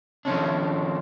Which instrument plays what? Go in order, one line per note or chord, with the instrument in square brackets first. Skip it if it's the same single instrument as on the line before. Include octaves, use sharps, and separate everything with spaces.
[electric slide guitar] D#3 F3 C#4 D4